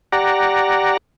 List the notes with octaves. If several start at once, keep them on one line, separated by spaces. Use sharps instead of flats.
G4 D5 F#5 A#5